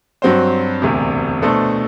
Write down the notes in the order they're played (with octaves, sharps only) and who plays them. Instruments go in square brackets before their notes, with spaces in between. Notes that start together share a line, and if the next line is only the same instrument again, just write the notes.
[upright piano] G2 F#3 C4 F#4 C5
E1 D2 C3
B2 A3 D4 A4 C5